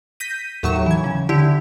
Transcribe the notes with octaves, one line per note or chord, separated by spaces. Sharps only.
G6 A#6 B6 D#7
D#2 A2 F#3 C#6 E7
E3 G#6
C#3
D3 E4 G4